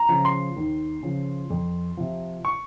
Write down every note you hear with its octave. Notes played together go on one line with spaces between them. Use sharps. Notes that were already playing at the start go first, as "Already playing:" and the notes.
Already playing: A#5
C#3 F3
C6
D#2
C#3 F3
F2
C3 F3
C#6